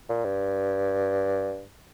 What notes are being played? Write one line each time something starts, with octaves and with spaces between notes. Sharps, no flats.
A#2
G2